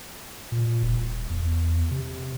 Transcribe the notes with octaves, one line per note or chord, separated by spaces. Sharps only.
A#2
D#1
E2
C3